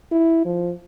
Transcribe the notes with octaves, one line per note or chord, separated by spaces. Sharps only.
E4
F3